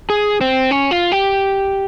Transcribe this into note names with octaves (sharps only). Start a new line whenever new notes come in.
G#4
C4
C#4
F4
G4